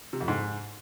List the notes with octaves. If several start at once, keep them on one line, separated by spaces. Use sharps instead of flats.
C3
F2
G#2